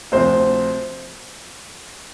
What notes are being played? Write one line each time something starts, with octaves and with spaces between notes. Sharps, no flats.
D2 C3 F3 C5